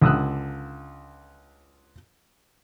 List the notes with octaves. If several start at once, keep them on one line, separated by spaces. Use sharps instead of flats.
C#2 D3 D#6 E6 F#6